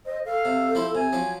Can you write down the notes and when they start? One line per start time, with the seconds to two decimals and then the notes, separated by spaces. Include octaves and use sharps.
0.06 C5 D#5
0.25 A4 F5
0.45 C3
0.75 F3 E4 C5
0.95 C3 G#5
1.13 F3 F#3 C#4